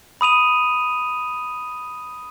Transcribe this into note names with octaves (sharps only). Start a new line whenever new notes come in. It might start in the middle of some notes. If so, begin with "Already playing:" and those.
B5 D#6 D#7 F7